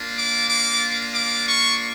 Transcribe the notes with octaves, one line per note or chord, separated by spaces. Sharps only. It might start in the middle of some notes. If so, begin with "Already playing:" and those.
Already playing: A#3 D4 F4
D6
D6
D6
C#6